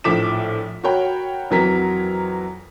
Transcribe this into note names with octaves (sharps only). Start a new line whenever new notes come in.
A#1 A2 F3 D6 B6 E7
F#4 A#4 C#5 G5 B5
F2 E3 F#3 A#4 B6